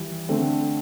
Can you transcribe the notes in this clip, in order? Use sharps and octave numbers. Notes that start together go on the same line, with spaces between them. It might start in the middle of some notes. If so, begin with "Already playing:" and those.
Already playing: E3 G3
D3 A3 C4